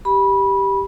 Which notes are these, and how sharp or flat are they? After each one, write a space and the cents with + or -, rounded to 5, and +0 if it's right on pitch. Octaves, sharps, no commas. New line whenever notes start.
G4 +0 B5 -20